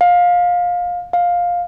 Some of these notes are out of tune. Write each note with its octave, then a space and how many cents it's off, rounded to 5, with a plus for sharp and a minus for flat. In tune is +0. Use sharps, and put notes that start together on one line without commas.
F5 +20
F5 +10